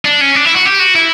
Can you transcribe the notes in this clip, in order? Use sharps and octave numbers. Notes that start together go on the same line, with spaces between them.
D4
C#4
D4
E4
F#4
G4
F#4
E4